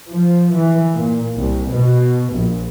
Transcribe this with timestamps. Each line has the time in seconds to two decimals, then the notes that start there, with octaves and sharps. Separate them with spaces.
0.12 F3
0.56 E3
0.94 A#2
1.39 C2
1.74 B2
2.35 A#1